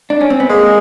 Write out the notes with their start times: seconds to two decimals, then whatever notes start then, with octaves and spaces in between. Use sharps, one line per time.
0.10 D4
0.21 C#4
0.30 C4
0.40 B3
0.49 G#3 A#3